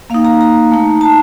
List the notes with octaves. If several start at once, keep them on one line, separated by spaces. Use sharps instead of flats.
A#3 D#4 F5
A#5
A#5
A3 D#4
A5